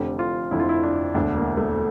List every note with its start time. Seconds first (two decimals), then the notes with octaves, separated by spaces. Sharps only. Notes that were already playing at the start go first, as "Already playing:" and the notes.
Already playing: F1 F2 D3 G4
0.19 F4
0.51 F1 F2 D3 E4
0.60 F4
0.69 E4
0.83 D4
1.14 E1 D2 D3 D4
1.36 A#3
1.57 A3